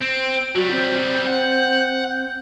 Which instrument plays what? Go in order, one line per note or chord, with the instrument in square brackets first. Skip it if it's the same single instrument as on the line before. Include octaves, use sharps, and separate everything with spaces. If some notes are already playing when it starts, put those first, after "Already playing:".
[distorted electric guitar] C4 [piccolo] D7
[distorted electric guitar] F#3 G3 [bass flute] F#4
[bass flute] C4 [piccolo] G6
[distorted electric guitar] F#5